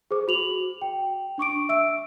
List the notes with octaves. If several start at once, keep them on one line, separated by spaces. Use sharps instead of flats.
G#4 C5 D6
F#4 F7 F#7
G5
D4 C#6 D6 D7
E5 E6 D7